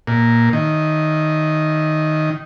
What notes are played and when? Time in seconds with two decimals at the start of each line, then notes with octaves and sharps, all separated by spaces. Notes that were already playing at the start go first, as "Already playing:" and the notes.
0.07 A#2
0.53 D#3